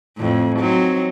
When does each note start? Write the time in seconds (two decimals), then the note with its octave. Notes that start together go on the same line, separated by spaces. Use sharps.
0.17 F2 A2
0.59 F#3 C4 D#4